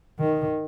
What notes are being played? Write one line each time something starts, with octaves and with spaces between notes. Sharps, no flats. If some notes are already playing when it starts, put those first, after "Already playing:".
D#3